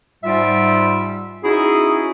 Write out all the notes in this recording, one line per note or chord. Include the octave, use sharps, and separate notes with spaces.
G#2 G3 F4 E5
C#4 D#4 E4 F#4 G#4